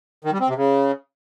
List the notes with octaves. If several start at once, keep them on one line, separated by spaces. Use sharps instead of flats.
D#3
G3
C4
C3
C#3